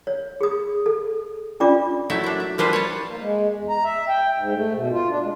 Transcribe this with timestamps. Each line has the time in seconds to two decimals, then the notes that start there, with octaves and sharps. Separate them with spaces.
0.07 C#5
0.41 G#4 D#6
0.86 A4
1.60 C#4 D4 F4 D5 D6
2.10 F#3 A3 E4 E5
2.24 D4 E5
2.40 E5
2.58 F3 G3 B4 C5
2.73 C#5 A5
3.08 A#3
3.20 G#3
3.57 E2
3.69 A#5
3.84 E5
4.08 G5
4.37 G#2
4.54 A3
4.73 B2
4.92 F4
5.09 D4
5.21 G#3